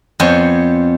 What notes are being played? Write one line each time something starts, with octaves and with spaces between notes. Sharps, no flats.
F2 B3 C5 C#5 G#5